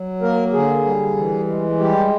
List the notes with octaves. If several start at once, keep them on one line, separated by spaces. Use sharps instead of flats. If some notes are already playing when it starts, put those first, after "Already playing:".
Already playing: F#3
A#3 A#4
D3 G#4
G3
E3
G#3
G3 G4